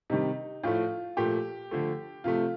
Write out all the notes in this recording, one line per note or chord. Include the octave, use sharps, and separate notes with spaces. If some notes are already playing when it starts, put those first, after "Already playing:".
C3 D#3 G3 D#4
A2 F3 A3 F4
A#2 F3 A3 G4
D3 F3 A3
C3 F3 A3 F4